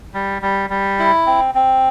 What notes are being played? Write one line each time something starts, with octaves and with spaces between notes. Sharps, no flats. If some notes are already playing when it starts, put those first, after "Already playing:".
G3
G3
G3
E4
C4
C4